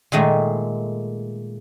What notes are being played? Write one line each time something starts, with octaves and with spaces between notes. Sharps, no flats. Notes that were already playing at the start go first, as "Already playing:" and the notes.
A#2 D#3 G#3 A3